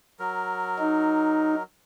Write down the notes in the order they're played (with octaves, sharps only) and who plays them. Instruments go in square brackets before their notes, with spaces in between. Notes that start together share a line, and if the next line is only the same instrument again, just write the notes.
[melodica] F#3 A#4
[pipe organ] D#4